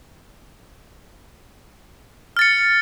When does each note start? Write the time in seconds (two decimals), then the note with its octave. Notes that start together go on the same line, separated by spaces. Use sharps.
2.37 F6
2.39 A6
2.42 C#7